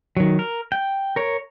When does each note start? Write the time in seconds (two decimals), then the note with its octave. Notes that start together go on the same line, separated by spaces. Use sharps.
0.17 D#3 F#3
0.39 A#4
0.72 G5
1.16 A#4 C#5